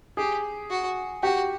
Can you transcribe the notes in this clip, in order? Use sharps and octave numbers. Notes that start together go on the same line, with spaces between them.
G4 G#4
F#4
F#4 G4